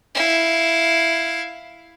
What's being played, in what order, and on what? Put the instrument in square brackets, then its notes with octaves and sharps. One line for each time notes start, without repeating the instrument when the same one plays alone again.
[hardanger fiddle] E4 F5